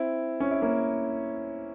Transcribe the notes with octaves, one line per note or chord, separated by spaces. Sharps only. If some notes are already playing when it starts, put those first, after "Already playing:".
Already playing: C4 E4
C#4
E4
A#3 C#4